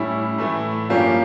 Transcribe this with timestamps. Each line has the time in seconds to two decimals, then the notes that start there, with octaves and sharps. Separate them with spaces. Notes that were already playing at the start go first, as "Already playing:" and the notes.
Already playing: A2 G3 C#4 E4
0.38 A2 E3 A3 E4
0.89 G2 F3 A#3 C#4 G4